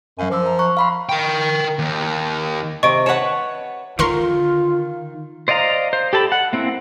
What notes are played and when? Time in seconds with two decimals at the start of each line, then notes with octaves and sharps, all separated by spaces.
0.19 F#2 F#3 F5 G#5
0.30 F3 A#4 D6 E6
0.46 A#5
0.59 A#5 C#6 F#6
0.77 F5 B5 C6
1.09 A#4 G5
1.79 D#2
2.83 C3 D#5 C#6 D7
3.06 B4 C#5 F#5 A5
3.99 D3 D#3 F4 A#4 C6 C#6
5.48 C5 D5 D#5 F5 A#5
5.93 C5
6.13 G4 A4 A5 B5
6.32 F#5
6.53 A#3 C4 E4